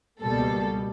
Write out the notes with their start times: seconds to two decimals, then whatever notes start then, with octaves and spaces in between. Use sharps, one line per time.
0.22 C#2 B2 G3 A#3 A4